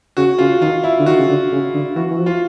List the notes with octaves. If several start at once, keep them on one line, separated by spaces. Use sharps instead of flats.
C#3 F#4
C#3 F4
D#3 F4
E4
D3
D#3 F#4
C#3
D3
C#3
D3
E3 F#4
E3
F3
F4